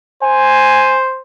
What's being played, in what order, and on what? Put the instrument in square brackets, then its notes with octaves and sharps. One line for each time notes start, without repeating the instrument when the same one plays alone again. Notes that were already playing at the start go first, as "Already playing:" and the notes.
[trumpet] C5 [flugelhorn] G#5